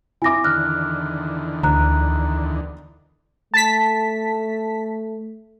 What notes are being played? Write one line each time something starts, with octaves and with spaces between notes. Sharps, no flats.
E4 G#5 D6 A#6
E2 D3 D#3 F6 F#6
D2 A#5 F#6
A3 A5 B6